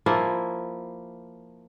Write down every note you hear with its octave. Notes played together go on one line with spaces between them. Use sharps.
F3 A#3 E4